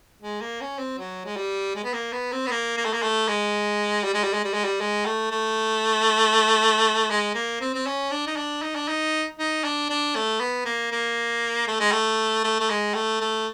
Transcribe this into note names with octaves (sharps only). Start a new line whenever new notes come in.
G#3
A#3
C#4
C4
F#3
G#3
G3
G#3
B3
A#3
B3
C4
B3
A#3
A#3
A3
A#3
A3
G#3
G3
G#3
G3
G#3
G3
G#3
G3
G#3
A3
A3
G#3
A#3
C4
C4
C#4
D4
D#4
D4
D#4
D4
D#4
D#4
D4
D4
A3
B3
A#3
A#3
A3
G#3
A3
A3
A3
G#3
A3
A3